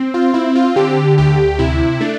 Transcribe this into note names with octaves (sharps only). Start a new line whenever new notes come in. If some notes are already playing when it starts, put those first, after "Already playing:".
Already playing: C4
F4
C4 E4
F4
D3 G4
D2 G4
C3 E4
A3 D4